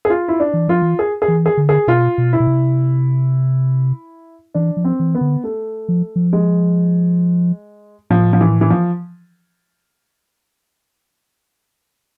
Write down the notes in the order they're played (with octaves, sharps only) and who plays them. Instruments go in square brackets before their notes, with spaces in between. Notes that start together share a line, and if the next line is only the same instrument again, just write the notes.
[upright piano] G#4
F4
E4
D4
[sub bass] E3
[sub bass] F3 [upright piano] F4
[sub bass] E3
[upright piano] G#4
G#4
[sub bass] E3
[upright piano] G#4
[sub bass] D3
[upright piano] G#4
[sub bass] B2 [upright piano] F4
[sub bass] B2
[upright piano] E4
[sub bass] B2
C3
[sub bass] E3 [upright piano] D4
[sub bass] F3
[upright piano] C4
[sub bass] E3
[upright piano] B3
[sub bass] D3
[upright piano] A3
[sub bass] F3
F3
[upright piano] G#3
[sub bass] A2 [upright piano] F3
[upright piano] F3
E3
E3
F3